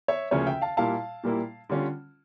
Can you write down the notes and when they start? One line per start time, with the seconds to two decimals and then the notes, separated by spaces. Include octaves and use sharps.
0.08 C#5 E5
0.31 D2 C#3 F3 A#3 C#4 C#5 E5
0.46 E5 G5
0.62 F5 A5
0.77 A#2 G3 A#3 E4 F5 A5
1.23 A#2 G3 A#3 E4
1.69 D3 G3 C#4 F4